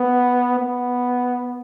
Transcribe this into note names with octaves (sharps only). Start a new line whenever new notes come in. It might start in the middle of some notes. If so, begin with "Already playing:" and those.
Already playing: B3
B3